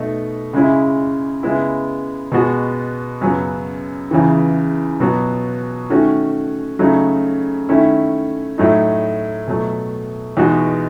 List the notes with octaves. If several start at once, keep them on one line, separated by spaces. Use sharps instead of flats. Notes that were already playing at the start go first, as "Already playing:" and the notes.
Already playing: B2 A3 D#4
C#3 G#3 C#4 E4
C#3 G#3 B3 E4
B2 G#3 B3 F#4
F#2 C#3 F#3 B3
E2 C#3 E3
B2 F#3 B3 F#4
D#3 A3 C#4 F#4
C#3 F#3 A3 D#4
D#3 A3 C#4 E4
A2 F#3 A3 D#4
B2 F#3 A3
E2 B2 G#3 D#4 F#4